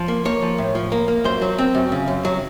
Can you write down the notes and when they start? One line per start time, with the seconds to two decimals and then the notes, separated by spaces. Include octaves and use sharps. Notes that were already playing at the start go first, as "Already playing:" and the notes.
Already playing: F3
0.08 A#3
0.25 A#3 C#5
0.42 F3
0.58 A2
0.75 F3
0.92 A#3
1.08 A#3
1.24 F#2 C5
1.42 F#3
1.58 C4
1.75 F#2
1.92 C#3
2.08 F#2
2.25 F#3